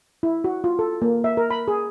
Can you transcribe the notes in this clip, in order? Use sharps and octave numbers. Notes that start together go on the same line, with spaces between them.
E4
F#4
F4
A4
A#3
E5
A#4
B5
G#4